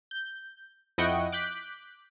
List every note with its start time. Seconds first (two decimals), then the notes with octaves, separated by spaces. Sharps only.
0.11 G6
0.98 F2 E4 D#5 F#5 G5 C#6
1.32 D6 F#6 G6 B6